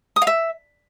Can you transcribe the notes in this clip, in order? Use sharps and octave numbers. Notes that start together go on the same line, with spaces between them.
D#6
F5
E5